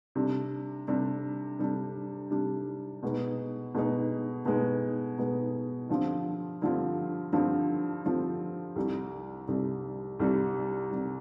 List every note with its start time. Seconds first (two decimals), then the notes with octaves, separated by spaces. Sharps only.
0.15 C3 G3 D4
0.88 C3 G3 D4
1.59 C3 G3 D4
2.30 C3 G3 D4
3.03 B2 G#3 B3 D#4
3.74 B2 G#3 B3 D#4
4.45 B2 G#3 B3 D#4
5.18 B2 G#3 B3 D#4
5.89 G2 D3 F3 C4 F4
6.62 G2 D3 F3 C4 F4
7.33 G2 D3 F3 C4 F4
8.04 G2 D3 F3 C4 F4
8.76 C2 C3 G3
9.48 C2 C3 G3
10.20 C2 C3 G3
10.91 C3 G3